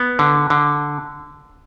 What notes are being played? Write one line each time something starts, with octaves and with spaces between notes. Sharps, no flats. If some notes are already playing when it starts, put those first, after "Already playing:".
Already playing: B3
D3
D3